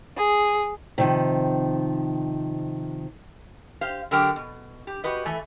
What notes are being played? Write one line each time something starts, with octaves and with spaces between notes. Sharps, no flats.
G#4
C3 D#3 F3
G4 C5 F5
D3 F#3 G4 A#4 G5
B2
G4
F#4 G4 B4 D#5
E3 A3 G#5